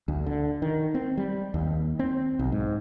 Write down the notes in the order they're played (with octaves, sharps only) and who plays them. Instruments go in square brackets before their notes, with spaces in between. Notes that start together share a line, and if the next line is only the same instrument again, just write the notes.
[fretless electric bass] D2
D3
D#3
C4
G3
D#2
C4
B1
G#2